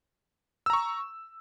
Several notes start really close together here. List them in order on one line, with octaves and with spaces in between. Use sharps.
E6 A#5 C#6